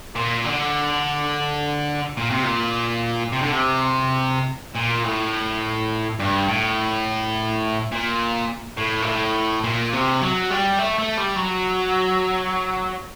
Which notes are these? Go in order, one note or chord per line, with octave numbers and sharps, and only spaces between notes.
A#2
D3
A#2
C3
A#2
C3
D3
C3
A#2
A2
G2
A2
A#2
A2
A#2
A2
A#2
C3
F#3
G3
A3
A3
G3
F#3